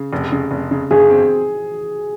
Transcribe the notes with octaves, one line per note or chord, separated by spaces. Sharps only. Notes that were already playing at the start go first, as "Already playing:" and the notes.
Already playing: C#3
F1
C#3
F1
C#3
G1 G#4
C4